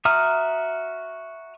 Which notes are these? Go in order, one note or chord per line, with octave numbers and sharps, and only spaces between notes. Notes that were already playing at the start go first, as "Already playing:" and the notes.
F#4 E5 A#5 D#6 F6